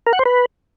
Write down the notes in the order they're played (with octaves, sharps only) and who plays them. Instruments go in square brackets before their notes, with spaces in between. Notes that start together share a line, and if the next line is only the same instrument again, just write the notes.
[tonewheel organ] A#4
F#5
C5
B4